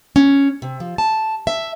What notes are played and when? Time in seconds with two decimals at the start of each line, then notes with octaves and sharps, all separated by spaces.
0.16 C#4
0.62 C3
0.80 F3
0.98 A5
1.47 E5